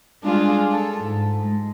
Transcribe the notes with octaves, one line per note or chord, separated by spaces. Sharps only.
G3 G#3 D4 F4 G#4
A4
G#2
G#3